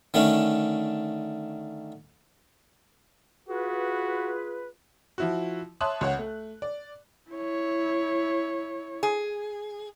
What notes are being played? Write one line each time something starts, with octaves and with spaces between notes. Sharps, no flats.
D3 D#3 A3 C#4
F4 F#4 G#4 B4
F3 E4 F#4
C#5 E5 A5 C6 D#6 F#6
C#2 C#5 F#5
A3
D5
E4 C#5
G#4